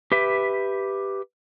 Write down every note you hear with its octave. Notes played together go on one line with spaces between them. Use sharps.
G4 B4 E5